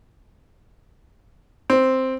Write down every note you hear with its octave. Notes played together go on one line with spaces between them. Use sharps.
C4